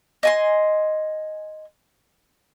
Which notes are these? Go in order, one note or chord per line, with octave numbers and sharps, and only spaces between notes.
D#5 G#5 C6